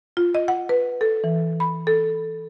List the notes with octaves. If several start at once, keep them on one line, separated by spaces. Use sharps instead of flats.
F4
D#5
F#5
B4
A4
E3
B5
A4